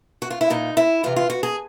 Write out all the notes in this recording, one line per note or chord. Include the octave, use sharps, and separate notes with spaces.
F#4
F4
E4
A#2 D#4
E4
C3 E3 F4
F4
F#4
G#4